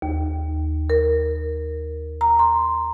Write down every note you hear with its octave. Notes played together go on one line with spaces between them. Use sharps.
D#2
A#4
A#5
C6